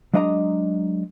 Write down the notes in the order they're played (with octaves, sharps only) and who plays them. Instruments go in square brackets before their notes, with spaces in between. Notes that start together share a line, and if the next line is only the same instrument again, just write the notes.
[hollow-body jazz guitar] F#3 G#3 D4 D#5 F5 A#5